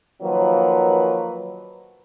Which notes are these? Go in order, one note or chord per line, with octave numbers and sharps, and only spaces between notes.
D#3 F3 F#3 A#3 B4